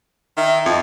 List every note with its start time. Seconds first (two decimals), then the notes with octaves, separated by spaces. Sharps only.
0.37 D#3 E5
0.66 F2 D#5